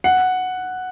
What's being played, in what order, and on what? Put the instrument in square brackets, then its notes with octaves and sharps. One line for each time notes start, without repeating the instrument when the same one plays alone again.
[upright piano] F#5